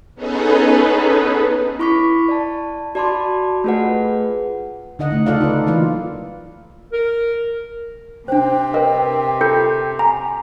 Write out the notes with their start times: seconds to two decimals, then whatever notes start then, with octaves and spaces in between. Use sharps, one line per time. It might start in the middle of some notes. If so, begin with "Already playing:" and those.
0.15 B3 C#4 D#4 G#4 A4 B4
1.79 E4 B5 C#6 D6 B6
2.28 D5 A5
2.95 F#4 D5 A5 B5 C6 D6
3.64 A3 F4 G#4 B4 F#5
4.99 D3 D#4 D#5 F#5
5.10 C#3 A3 D#4
5.26 D#4 F4 A4 D5 F5 F#5
5.41 D#4 B4
5.67 E3 F#3 A#3 F4 D5
6.93 A#4
8.28 C3 D4 C5 G5
8.74 A#4 B4 D#5
9.41 F4 A4 G6 C#7
9.99 G#5 A#5